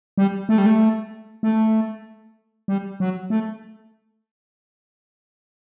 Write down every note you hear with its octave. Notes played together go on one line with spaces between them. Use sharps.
G3
A3
G3
A3
A3
G3
F#3
A3